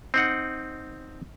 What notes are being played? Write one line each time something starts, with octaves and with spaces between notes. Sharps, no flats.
C4 D#4 F#5